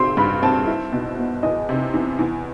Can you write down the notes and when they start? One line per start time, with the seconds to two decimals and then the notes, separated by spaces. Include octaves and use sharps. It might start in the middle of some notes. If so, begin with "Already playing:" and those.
Already playing: C3 D#3 C4 C6
0.17 G2 B5
0.42 C4 A5
0.67 E4
0.92 B2
1.18 B3
1.43 E2 D#5
1.69 C3
1.94 E2
2.19 E2